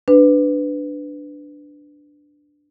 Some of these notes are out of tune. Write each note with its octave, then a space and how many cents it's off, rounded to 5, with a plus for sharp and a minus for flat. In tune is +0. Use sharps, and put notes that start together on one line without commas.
D4 +0 B4 +15